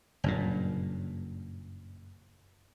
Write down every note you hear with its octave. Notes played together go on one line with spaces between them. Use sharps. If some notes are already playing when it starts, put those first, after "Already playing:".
F#1 G2 A#2